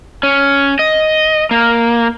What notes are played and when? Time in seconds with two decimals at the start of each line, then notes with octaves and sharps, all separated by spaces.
0.23 C#4
0.79 D#5
1.51 A#3